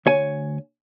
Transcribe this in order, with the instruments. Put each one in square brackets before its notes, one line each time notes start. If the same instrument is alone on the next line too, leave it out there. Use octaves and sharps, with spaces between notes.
[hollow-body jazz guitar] D2 C#5 G#5